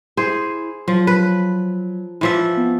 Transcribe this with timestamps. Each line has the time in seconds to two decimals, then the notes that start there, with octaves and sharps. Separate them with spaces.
0.17 E4 G#4 C5
0.88 F3 F#3
1.07 B4
2.21 E3 F3 E5
2.57 B3